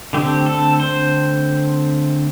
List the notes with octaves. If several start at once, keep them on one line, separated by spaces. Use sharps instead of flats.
D3 A3 C4 G4
A4
C5